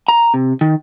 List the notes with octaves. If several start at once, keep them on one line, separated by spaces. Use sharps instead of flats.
A#5
C3
D#3